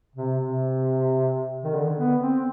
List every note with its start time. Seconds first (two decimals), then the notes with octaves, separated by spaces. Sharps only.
0.15 C3
0.38 C3
1.64 D#3
1.75 D3
1.98 B3
2.20 C4